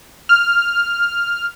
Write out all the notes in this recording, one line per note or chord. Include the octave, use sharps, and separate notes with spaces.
F6